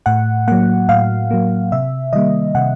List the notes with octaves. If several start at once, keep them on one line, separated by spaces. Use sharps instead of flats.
A2 F#5
F#3 A#3 F#5
A2 F5
F#3 A#3
C3 E5
D#3 G3 A#3 D#5
C3 F#5